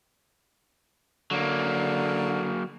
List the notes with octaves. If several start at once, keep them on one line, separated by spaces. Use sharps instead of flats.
D3 F#3 A#3